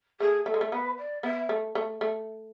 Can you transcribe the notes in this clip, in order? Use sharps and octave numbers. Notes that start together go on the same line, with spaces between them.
A3 G#4
A3 A4
G#3
A3
B3 B4
D5
B3 E5
A3
A3
A3